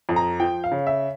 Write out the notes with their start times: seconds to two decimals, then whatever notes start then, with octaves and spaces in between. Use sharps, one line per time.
0.09 F2
0.16 A#5
0.40 F3 G5
0.64 F5
0.72 C#3
0.87 E5